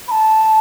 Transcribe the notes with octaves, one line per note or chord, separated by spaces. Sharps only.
B5
A5